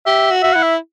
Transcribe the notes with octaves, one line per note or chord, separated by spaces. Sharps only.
G4 E5
F#4
F#4 E5
E4 F#5
E5